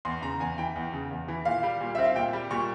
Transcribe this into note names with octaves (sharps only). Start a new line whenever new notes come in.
E2 C6
C#3 A#5
E2 G#5
E3 G5
E2
C#3
E2
E3
A#2 F5
G3
A#2
C4 E5
F5
A#2 G5
G3
A#2 C#6